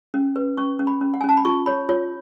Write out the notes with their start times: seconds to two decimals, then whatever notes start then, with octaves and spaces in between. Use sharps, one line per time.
0.14 C#4
0.36 B4
0.57 C#4 C#6
0.79 C#4
0.87 B5
1.01 C#4
1.14 F#5
1.21 G#5
1.24 C#4 A5
1.37 B5
1.45 F4 C#6
1.66 C#5 B5
1.89 F4 C#5